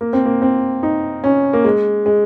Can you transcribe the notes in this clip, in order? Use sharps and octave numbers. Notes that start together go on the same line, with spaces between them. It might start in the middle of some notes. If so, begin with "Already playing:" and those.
A#3
C4
A#3
C4
D#4
C#4
A#3
G#3
G#3